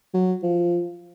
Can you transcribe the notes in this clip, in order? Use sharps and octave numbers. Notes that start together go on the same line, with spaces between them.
F#3
F3